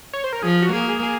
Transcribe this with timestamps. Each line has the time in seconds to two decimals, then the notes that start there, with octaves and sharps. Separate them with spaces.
0.13 C#5
0.24 C5
0.33 A#4
0.43 F3 G#4
0.62 F#4
0.73 A#3 G#4
0.89 G#4
1.03 G#4